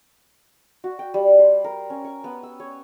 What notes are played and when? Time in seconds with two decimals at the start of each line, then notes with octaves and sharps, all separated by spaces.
0.84 F#4
0.99 G5
1.14 G3
1.39 C5
1.64 A#4
1.90 C#4
2.04 C#6
2.24 B3
2.43 E6
2.60 C#5